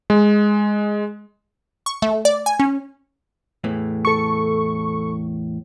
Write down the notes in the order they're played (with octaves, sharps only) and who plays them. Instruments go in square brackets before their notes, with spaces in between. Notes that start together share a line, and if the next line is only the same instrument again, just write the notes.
[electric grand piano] G#3
[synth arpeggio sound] C#6
A3
D5
G#5
C#4
[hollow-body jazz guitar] E2 A2 E3
[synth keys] A4 C#6